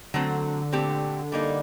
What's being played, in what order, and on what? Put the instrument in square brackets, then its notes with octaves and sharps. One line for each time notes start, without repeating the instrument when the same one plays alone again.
[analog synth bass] D3 [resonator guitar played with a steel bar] F#3 A3 C4
[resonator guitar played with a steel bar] A#2 A3 C4 G4
G3 A#3 D#4